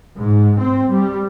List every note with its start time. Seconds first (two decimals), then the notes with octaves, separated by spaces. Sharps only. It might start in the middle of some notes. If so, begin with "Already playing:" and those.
0.18 G#2
0.59 C4
0.90 G3